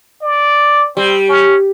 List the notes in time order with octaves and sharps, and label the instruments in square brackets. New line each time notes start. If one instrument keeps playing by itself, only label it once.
[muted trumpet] D5
[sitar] G3 [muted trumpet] C4
[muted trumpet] C#4